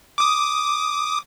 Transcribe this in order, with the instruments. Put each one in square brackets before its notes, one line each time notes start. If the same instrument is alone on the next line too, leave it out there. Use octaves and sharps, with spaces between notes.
[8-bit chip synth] D6 D#6